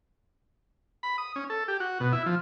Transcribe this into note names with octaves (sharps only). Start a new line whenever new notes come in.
B5
D#6
C#4
A4
G4
F#4
B2
E4
F3